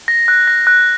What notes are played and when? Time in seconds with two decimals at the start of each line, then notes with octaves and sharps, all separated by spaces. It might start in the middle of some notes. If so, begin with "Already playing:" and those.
0.08 A#6
0.28 F#6
0.48 A#6
0.67 F#6